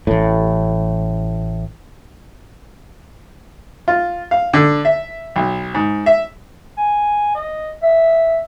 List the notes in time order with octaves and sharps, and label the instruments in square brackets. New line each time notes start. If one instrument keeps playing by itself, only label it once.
[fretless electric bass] A1 A2
[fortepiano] F4
F5
D3
E5
B1
G#2
E5
[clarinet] G#5
D#5
E5